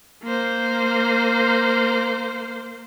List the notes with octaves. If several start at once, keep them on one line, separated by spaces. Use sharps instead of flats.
A#3 C5